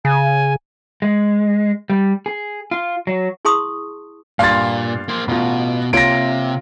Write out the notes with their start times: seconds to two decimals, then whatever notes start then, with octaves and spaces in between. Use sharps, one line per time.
0.05 C#3 G#5
1.02 G#3
1.90 G3
2.26 G#4
2.71 F4
3.07 F#3
3.45 E4 G#4 A5 C6 C#6 D#6
4.39 G2 A#2 F5 C6 A6
5.08 A#3 C5
5.28 A1 B2 F4
5.93 C3 A#3 F4 C#5 A#6 D7